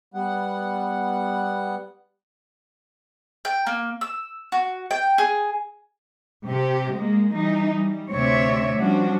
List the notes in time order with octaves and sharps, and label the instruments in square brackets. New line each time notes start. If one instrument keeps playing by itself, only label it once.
[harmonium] G3 B3 F#5
[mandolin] G5
A#3
E6
F#4
G5
G#4
[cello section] C3 G4
G#3 A#3
E3 G3 D#4
G3
D2 C3 C4 C#5 D5 E5
F3 G3 C#4 D4 F#4